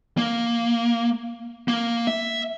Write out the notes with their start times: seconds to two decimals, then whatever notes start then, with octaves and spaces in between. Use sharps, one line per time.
0.17 A#3
1.68 A#3
2.07 E5